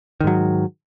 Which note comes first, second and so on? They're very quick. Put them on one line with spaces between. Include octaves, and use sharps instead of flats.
D#3 G#2 F#3